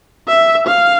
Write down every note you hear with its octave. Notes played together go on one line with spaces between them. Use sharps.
E5
F5